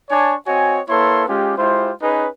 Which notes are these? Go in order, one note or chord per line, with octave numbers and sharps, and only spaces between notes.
D4 C#5 G#5 A5 C#6 D6
C4 F#4 C#5 D#5 G#5
A#3 E4 A4 B4 C#5 C6
G#3 C#4 F4 G4
G#3 E4 F4 G4 C5
C#4 D#4 G#4 B4